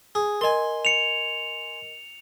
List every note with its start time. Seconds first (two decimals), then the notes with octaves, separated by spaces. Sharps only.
0.15 G#4
0.41 A#4 D#5 G#5 C6
0.85 C#7 F7